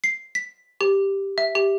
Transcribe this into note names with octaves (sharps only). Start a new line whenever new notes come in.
C7
B6
G4
E5
G4